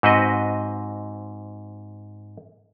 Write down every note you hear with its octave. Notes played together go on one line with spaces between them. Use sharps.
G#2 C4 F#4 B4 D#5